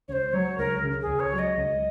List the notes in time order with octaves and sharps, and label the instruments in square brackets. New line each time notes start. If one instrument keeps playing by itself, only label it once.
[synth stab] C#2 [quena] C#5
[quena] C5
[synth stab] F#3 [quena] C#5
[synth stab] C#2 [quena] A#4
[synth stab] C#3
[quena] G#4
[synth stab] C#2
[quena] C#5
[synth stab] F#3
[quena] D#5
[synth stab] C#2